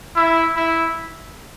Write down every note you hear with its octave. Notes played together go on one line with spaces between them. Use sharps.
E4
E4